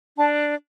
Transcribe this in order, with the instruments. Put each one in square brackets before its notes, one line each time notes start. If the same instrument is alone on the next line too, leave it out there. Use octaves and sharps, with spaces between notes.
[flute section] D4 [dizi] A5